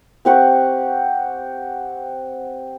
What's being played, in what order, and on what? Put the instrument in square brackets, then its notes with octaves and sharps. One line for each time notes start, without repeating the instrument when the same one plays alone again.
[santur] C4 G4 F#5 C#6